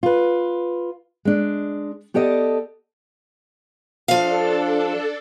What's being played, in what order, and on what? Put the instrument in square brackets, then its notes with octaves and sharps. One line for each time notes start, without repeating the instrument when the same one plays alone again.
[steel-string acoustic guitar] F4 B4
G#3 D4
B3 G4 A4 D5 D#5
[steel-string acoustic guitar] F3 F5 [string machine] D4 A4